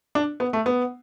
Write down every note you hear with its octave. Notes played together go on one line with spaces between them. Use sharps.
D4
B3
A3
B3